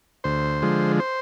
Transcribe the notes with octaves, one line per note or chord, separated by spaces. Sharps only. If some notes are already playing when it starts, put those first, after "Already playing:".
D2 C5
D3 F3 G#3
C5